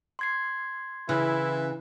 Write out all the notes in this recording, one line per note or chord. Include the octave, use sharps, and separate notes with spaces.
C6 G#6 C7
C#3 E3 E4